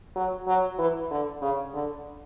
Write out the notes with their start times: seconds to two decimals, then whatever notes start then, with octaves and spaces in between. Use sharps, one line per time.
0.16 F#3
0.47 F#3
0.78 E3
1.11 D3
1.42 C#3
1.73 D3